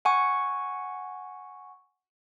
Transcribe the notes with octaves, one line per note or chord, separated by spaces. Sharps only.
F#5 G#5 C#6